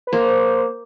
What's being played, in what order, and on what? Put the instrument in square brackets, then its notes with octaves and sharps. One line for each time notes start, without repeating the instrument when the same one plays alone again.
[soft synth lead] B4
[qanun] A#3 [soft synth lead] C5